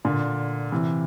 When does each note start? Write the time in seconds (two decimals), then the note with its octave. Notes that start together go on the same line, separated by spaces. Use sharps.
0.05 A#2 D3
0.72 C3 E3